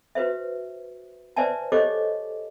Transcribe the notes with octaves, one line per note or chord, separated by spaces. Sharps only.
F#4 B4 C5 E5
B4 C5 D5 E5 G#5 A5
G4 A4 C5 C#5 D#5 D6